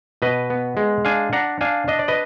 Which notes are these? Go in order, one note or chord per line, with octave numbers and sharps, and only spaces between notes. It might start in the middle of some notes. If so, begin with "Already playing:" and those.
B2 B4 D#5
B3
G#3
D4 F5 G#5
D4 F#5 A#5
D4 F5 G#5
D4 D#5
D5
B4 D#5